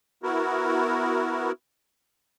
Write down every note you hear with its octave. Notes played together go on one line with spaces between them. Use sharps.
B3 E4 F#4 A#4